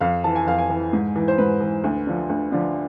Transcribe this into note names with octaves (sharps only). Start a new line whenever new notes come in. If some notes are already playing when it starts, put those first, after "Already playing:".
F2 F5
E3 A5
G#5
F2 F5
G#5
E3
G#2
E3
C5
G#2 B4
E3
D2
D3 F3
D2
D3 F3